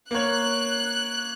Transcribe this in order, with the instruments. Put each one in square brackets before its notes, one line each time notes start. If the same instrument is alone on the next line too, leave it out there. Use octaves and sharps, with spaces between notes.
[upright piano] A#3 C#5 [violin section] F#6